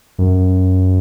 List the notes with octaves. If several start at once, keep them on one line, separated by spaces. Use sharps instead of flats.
F#2